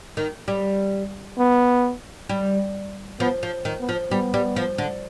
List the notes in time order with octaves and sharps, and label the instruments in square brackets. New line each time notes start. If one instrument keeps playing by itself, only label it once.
[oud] D#3
G3
[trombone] B3
[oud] G3
[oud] F3 [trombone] B3
[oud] F3
D#3
[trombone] B3
[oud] F3
[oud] G3 [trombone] B3
[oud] G3
F3
D3